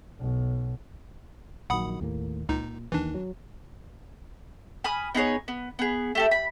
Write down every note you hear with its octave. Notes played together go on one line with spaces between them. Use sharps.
B1
A#1 D#3 F#3 F#5 B5 D#6
D#2 A2 A#3
C#2 A#2 D#4
D#2 D#3 E3 D4
F#3
G#5 B5 D#6 F6
B3 D#4 G#4 C#5
B3
B3 G#4
A3 G4 A4
B5